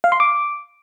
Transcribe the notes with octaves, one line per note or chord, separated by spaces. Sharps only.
F5
C6
D6